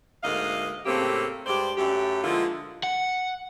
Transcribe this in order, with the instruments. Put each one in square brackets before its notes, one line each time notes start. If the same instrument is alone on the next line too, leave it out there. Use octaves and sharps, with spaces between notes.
[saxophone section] D2 G#2 A#3 D#5 F5
A2 C#3 A3 A#3 C4 G4
G2 G#3 G4 C5 D5
F#2 A3 G4
D3 F3 G#3 A#3 E4 F4
[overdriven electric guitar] F#5